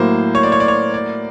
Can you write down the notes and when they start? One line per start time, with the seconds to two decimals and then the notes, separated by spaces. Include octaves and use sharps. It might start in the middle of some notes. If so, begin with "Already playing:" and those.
Already playing: A2 F#3 A#3 C5
0.35 C#5
0.43 D5
0.52 C#5
0.60 D5
0.68 C#5
0.94 D5